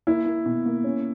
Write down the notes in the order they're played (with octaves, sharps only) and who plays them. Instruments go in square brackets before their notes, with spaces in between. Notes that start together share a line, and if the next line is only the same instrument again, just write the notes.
[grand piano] A#3 [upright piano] E4
[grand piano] A#3
B2
A#3
C#4